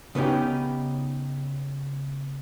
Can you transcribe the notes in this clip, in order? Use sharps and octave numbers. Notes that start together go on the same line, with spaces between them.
C#3 B3 C#4 D#4 G4